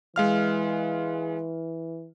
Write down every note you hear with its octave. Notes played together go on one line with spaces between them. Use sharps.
E3 G#3 F5 F6